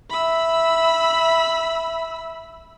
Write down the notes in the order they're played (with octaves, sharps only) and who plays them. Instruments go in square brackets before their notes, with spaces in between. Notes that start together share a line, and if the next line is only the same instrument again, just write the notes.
[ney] E5 [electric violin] B5 E6